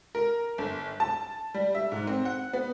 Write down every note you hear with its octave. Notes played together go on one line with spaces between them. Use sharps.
A#4
G1
A5
G3
E5
G#2
C4
F#5
B3